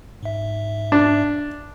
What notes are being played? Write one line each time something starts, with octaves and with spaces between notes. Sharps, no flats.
G#2 E5
D4